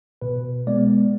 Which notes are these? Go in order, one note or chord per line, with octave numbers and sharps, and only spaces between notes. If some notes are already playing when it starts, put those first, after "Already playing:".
B2 B4
G#3 B3 D5